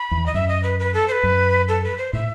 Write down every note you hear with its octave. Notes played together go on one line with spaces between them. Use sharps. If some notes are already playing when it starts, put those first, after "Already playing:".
Already playing: B5
E2
D#5
F#2 E5
D#5
B4
B4
A4
C5
B4
F#2
A4
B4
C5
A2 E5